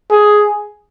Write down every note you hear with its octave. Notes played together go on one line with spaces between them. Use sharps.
G#4